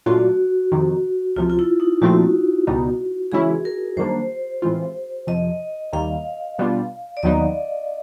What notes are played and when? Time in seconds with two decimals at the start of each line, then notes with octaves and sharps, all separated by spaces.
0.06 A#2 F#3 A3 D4 F4 F#4
0.72 F2 C3 D#3
1.36 C#2 C3 F3 F4
1.50 F4
1.59 E4
1.80 D#4
2.02 A#2 F3 A3 C4 F#4
2.67 C#2 B2 G3 B3 D#4
3.32 C#3 E3 G#3 C#4 E4 G#4
3.65 A#4
3.97 F#2 D#3 G3 A#3 D4 C5
4.62 A2 E3 G#3 C4 F4
5.27 F2 C3 F3 D#5
5.93 D#2 D#3 G3 A#3 F5
6.59 B2 G3 B3 D4 F4
7.17 D5
7.23 D#2 D#3 F#3 B3 D#4 D#5